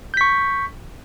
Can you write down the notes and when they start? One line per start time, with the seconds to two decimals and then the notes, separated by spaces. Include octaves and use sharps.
0.14 G6
0.17 B6
0.21 C#6